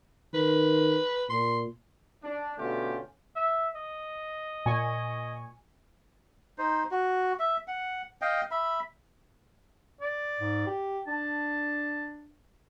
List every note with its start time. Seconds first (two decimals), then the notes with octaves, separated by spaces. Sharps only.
0.34 D#3 B4
1.29 A#2 C6
2.24 D4
2.59 B2 D3 A3 C#4 F4 G4
3.36 E5
3.76 D#5
4.66 A#2 G#5 C#6
6.58 D#4 C5
6.91 F#4
7.39 E5
7.68 F#5
8.22 D#5 F5 G5
8.51 E5 B5
10.01 D5
10.40 G#2
10.67 G4
11.07 D4 A5